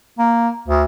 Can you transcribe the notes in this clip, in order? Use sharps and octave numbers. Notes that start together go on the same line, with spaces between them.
A#3
D2